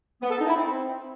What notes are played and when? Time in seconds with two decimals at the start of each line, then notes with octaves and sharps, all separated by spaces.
0.22 B3
0.30 A4
0.39 D#4
0.47 E4
0.56 C4